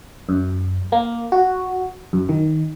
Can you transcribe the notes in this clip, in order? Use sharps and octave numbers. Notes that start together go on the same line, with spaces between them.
F#2
A#3
F#4
F#2
D#3